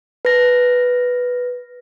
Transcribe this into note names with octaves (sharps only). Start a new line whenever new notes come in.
B4 A#6